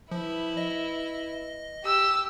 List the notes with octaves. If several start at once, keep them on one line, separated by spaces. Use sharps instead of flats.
F3 E4 B4
D#5
G4 E6